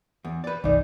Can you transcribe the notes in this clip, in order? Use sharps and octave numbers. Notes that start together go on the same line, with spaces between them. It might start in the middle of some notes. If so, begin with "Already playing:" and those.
E2
B4 D5
G1 C2 E3 D#4 D5